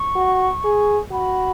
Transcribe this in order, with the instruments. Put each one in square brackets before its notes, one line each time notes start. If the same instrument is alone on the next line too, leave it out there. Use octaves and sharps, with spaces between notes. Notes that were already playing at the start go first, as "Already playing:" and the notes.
Already playing: [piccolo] C#6
[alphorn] F#4
G#4
[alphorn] F#4 [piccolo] B5